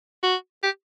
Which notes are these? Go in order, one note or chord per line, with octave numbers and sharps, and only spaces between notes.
F#4
G4